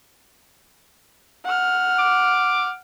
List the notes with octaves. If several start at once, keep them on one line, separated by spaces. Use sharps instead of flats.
F#5 F6
D6